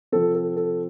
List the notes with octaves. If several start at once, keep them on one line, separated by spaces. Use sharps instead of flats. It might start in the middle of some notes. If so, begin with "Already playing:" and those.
C3 F3 C4 A4
A4
A4